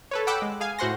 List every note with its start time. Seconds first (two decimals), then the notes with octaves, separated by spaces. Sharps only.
0.11 A4 B4 C#5
0.27 F#5 G5 B5 D6 E6 F#6
0.42 G#3
0.60 G#4 F5 G#5
0.79 A2 F#4 C5 F#5 C6 A#6